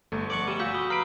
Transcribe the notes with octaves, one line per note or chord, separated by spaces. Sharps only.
G1 A3
D5 F#5 C#6 D6
G3 D#7 E7
A#2 F#4 E6 G6 B6
B5 D#6 G7
B4 A#5 F6 C7 D7